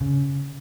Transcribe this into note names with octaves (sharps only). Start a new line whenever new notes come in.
C#3